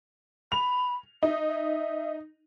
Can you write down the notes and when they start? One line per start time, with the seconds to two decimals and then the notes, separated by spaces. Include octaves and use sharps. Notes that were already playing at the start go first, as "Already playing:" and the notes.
0.52 B5 F7
1.23 D#4 E5
1.48 E5